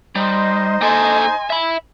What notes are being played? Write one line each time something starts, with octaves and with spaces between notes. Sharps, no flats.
G3 D#4 C5 D#5 C6
A#3 A4 G#5
E5 B5